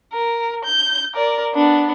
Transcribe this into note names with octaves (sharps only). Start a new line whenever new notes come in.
A#4
G6
A#4 D5
B3 D4